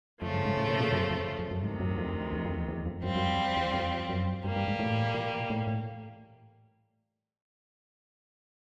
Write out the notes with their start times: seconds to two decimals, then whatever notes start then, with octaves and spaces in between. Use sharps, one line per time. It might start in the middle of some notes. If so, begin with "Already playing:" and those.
0.22 F2 C#3 F3 A3
0.33 G2
0.45 G#2
0.57 A2
0.69 A#2
0.80 A#2
0.92 F#2
1.10 F2
1.39 F2
1.51 F#2
1.62 D2 G#2 C3 D#3
1.80 F#2
1.98 F2
2.33 E2
2.45 F2
2.56 E2
2.68 E2
2.86 F2
3.04 F#2 G3 C4 F4
3.16 F#2
3.26 F2
3.56 E2
3.74 F2
4.09 F#2
4.44 G2 E3 G3 A#3
4.56 G2
4.68 G#2
4.79 A2
5.14 A#2
5.50 A2
5.67 A2